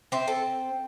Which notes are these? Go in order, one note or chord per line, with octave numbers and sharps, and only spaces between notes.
C4 C5 E5
A4